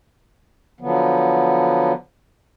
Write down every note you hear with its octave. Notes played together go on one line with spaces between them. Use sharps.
D3 F3 F#3 B3